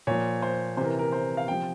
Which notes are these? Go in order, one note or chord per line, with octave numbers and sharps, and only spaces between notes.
A#2 F3 C#5
C5
C3 E3 A#4 C5
A#4
C5
F5
C3 F3 G5